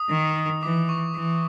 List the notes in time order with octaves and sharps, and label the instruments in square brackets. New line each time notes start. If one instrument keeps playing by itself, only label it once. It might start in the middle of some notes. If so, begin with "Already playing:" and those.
Already playing: [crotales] D#6
[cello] D#3
[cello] E3 [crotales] D6
[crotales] C#6
[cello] E3